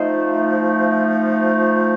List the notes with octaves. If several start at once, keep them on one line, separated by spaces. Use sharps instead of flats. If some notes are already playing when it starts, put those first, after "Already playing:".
Already playing: F3 A3 D#4 C5 D#5